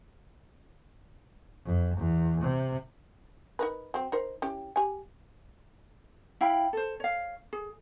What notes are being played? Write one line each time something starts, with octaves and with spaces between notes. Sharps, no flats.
F2
E2
C3
D#4 A#4 B4
F#3 C4
D#4 A#4 C5
C#4 E4 G4
G4 G#5
E4 F5 G5 B5
A4 C5
C#5 F5
G#4